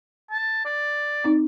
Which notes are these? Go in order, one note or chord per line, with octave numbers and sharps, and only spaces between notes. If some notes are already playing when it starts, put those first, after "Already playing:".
A5
D5
C4 D#4